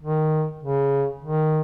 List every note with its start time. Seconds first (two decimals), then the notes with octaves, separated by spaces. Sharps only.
0.02 D#3
0.63 C#3
1.23 D#3